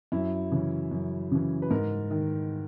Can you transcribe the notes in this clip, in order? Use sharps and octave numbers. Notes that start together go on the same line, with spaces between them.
F#2 E4
C#3 E3
F#2
C#3 E3
B4
G#2 A#4
D#3